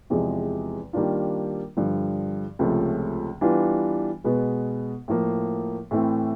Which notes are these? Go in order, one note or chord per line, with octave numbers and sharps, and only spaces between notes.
E2 C3 F3 G#3
D#3 G3 A#3 D4 F4
G2 D3 F3
C#2 C3 F3 A3 C#4
E3 G3 B3 D4 F4
B2 G#3 B3
A2 F3 A#3
A2 E3 A3 C4 E4